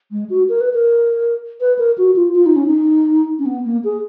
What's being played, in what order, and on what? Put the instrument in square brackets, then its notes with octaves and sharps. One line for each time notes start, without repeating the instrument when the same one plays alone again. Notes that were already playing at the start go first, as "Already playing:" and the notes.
[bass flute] G#3
F#4
A#4
B4
A#4
B4
A#4
F#4
F4
F4
D#4
C#4
D#4
C#4
B3
A#3
G#4